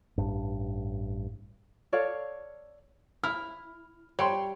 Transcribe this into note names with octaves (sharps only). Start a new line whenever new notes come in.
A1 G2
A4 C#5 D5 F5
E4 F6
G3 C#5 G5 C6